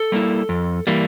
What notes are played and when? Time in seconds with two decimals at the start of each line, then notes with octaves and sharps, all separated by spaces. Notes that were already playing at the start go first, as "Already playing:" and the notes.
Already playing: A4
0.12 G3 A#3 E4
0.49 F2
0.87 E3 G3 A#3